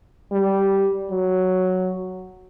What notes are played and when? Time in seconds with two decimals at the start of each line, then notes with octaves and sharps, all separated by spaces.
0.32 G3
1.11 F#3